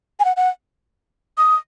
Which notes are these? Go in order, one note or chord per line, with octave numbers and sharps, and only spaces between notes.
G#5
F#5
F#5
D#6